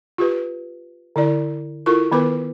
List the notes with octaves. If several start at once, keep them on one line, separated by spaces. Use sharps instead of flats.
F4 G4 B4
D3 E4 D5
E4 F4 A4 A#4 C#6
D#3 B3 A#4 B4 D6